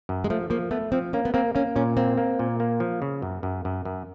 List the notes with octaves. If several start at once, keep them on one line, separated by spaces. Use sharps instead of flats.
F#2
G#3
F3 A3
F3 A#3
A3 B3
F3 C4
A#3 C#4
B3
A#3 C4
A#3 C#4
A#2 C#4
A#3 C4
A#3
A#2
A#3
F3
C#3
F#2
F#2
F#2
F#2